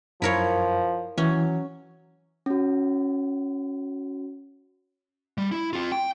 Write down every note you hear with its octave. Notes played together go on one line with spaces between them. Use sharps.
F#2 F3 E4 A#4 C#5
E3 F#3 C#4
C#4 F#4
G3
E4
C4 F4
G5